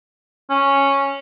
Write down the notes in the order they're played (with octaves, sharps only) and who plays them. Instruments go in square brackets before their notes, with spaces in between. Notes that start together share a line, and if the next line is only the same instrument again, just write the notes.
[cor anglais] C#4